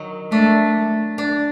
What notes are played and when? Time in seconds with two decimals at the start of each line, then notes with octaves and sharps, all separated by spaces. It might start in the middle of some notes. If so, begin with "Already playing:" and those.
Already playing: D#3 F#3
0.31 A3 D4
1.18 D4